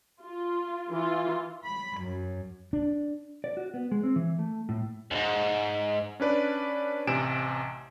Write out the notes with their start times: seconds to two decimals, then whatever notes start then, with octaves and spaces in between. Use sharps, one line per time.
0.22 F4
0.90 E3 F4
1.65 B5
1.98 F#2
2.73 D4
3.44 D5
3.57 F#4
3.74 B3
3.92 G#3
4.03 C4
4.16 E3
4.39 A3
4.69 A2
5.11 D#2 G#2
6.20 C#4 D4 B4 D5
7.07 A1 C3 G#5 D7 E7